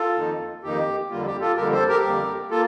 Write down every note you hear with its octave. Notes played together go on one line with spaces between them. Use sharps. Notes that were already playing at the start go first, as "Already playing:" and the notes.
Already playing: F4 A4
F2 D#3 A#3 D#4
F2 D#3 A#3 D#4 G4
F2 D3 G3 A#3 F4
G4
F4 A4
F2 D3 G3 A#3 G4 A#4
A4 C5
G4 A#4
F2 D3 G3 A#3
A#3 F4 A4